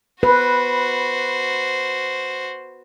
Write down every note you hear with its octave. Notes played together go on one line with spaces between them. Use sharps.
F#4 B4 C5